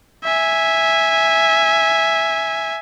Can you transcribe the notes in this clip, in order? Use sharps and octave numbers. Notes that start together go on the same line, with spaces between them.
E5 G#5